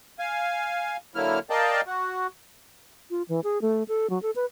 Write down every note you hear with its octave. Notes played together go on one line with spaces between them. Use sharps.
F5 G#5
D3 F#3 A#3 E4 F6
A#4 D5 D#5 F5 G5 A5
F#4
F4
E3
G#4
A3
A4
F#3
A4
B4